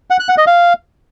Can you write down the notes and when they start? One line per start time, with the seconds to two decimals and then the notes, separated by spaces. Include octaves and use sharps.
0.10 F#5
0.19 F#6
0.29 F#5
0.38 D#5
0.47 F5